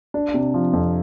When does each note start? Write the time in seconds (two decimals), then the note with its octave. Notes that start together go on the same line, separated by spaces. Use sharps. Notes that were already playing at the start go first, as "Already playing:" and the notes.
0.14 D4
0.34 C3
0.54 F3
0.73 F2